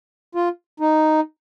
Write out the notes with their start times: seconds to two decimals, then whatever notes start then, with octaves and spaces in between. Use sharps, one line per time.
0.35 F4
0.80 D#4